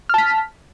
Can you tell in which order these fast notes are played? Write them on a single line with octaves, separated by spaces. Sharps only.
F6 A5 B6